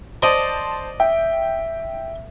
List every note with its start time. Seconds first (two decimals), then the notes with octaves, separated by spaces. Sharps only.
0.22 C5 D5 D#5 A5
1.00 E5 G5